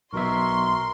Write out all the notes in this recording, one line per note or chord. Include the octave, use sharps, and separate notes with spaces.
B1 B2 A#4 E5 C6 C#6